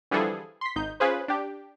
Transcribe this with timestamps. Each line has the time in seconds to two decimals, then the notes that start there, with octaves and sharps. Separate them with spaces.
0.11 D3 E3 F3 G3 G#4 A4
0.61 C6 B6
0.76 G#1 D#4 G6
1.00 C#4 F4 G#4 B4 C5
1.28 D4 G4